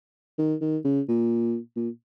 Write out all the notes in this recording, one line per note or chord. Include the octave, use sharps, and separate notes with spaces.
D#3
D#3
C#3
A#2
A#2